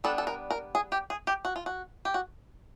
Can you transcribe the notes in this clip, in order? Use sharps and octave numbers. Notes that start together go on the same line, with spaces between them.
G3 B3 D4 A4
A4
A#4
A#4
G#4
G4
G#4
G4
F#4
F4
F#4
G4
F#4